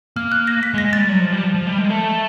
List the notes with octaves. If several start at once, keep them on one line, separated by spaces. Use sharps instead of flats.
A#3 F6
F#6
A#6
B6
G#3
A#6
G#3
G3 A6
F#3
F3
G3
F3
F3
G3
G#3
A3